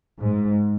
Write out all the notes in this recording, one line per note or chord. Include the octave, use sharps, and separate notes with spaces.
G#2